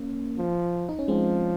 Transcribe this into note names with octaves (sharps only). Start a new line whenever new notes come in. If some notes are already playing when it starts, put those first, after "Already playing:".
Already playing: A#3 C#4
F3
D#4
C#4
F3 G#3 C4